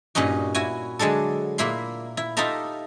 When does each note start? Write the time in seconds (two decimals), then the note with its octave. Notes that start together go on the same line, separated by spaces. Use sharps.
0.15 G2 A#2 C#4 D#4 F#4
0.55 E4 F#4 G#5
0.99 D3 F#3 G#3 D4 A4
1.58 A#2 A#3 E4 B5 C6
2.17 E4
2.37 D#4 F4 G4 A4 E5 A#5